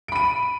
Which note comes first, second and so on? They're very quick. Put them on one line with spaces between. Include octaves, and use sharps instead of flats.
D7 B5 D#7